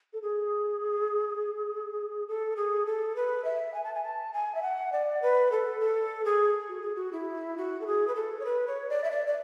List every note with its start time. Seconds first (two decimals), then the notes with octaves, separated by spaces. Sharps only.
0.13 A4
0.22 G#4
2.28 A4
2.57 G#4
2.86 A4
3.16 B4
3.45 E5
3.74 G#5
3.84 A5
3.94 G#5
4.03 A5
4.33 G#5
4.55 E5
4.62 F#5
4.92 D5
5.22 B4
5.52 A4
5.80 A4
6.25 G#4
6.69 F#4
6.82 G#4
6.95 F#4
7.12 E4
7.58 F#4
7.81 A4
7.86 G#4
8.08 B4
8.15 A4
8.40 C#5
8.45 B4
8.67 C#5
8.89 D5
9.04 E5
9.11 D5
9.27 D5